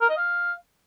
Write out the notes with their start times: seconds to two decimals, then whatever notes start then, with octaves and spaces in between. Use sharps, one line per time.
0.01 A#4
0.09 D#5
0.18 F5